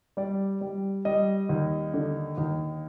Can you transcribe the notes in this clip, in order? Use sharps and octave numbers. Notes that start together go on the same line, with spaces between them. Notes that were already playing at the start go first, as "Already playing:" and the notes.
G3 D5
G3
G3 D#5
D#2
D3
D#2